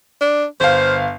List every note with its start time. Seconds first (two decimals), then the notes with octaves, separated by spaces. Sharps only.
0.21 D4
0.60 G1 C5 F5